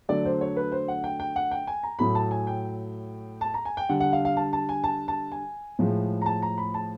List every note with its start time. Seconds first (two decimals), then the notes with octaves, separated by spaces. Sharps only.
0.09 D3 F#3 A3 D5
0.25 C5
0.41 C#5
0.57 B4
0.72 C5
0.88 F#5
1.04 G5
1.20 G5
1.36 F#5
1.51 G5
1.67 G#5
1.83 A#5
1.99 A2 F#3 A3 B5
2.15 A5
2.31 G#5
2.47 G5
3.41 A5
3.54 A#5
3.65 G#5
3.77 G5
3.89 D3 G3 F#5
4.00 F#5
4.13 F5
4.25 F5
4.37 A5
4.53 A5
4.69 G#5
4.84 A5
5.08 A5
5.32 G#5
5.79 A2 F3 G#3
6.22 A#5
6.26 A5
6.42 A#5
6.58 B5
6.74 A5